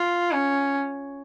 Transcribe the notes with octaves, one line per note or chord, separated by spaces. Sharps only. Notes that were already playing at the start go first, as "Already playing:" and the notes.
Already playing: F4
C#4